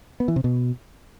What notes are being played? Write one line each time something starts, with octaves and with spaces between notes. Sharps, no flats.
B3
E3
C3
B2